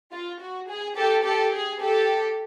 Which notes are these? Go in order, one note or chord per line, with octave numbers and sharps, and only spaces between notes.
F4
F#4
G#4
G4 A4
G4 A4
G#4
G4 A4